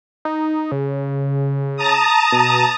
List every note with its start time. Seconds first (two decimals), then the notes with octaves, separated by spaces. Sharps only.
0.25 D#4
0.72 C#3
1.77 A5 A#5 D#6
2.32 B2